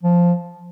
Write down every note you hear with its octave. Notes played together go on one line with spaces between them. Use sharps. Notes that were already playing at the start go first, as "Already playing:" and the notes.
F3